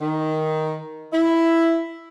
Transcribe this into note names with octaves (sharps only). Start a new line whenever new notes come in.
D#3
E4